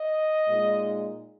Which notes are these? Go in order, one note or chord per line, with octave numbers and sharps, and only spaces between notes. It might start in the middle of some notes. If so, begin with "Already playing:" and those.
Already playing: D#5
A#2 G#3 D#4